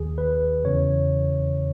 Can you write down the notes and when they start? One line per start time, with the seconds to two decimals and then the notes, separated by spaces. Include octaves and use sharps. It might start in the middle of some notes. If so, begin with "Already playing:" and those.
Already playing: D#2 D#3 G#4
0.18 B4
0.64 E2 C#3 E3 C#5